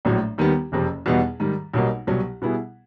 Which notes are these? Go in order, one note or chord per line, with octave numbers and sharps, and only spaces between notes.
A#1 A2 F#3
D#2 D#3 G3 B3
F#1 F2 C3
E2 B2 G3 B3 D#4
G#2 D#3 G3
B1 B2 G3 A#3 D#4
C2 B2 F#3
B2 G3 B3 E4 G#4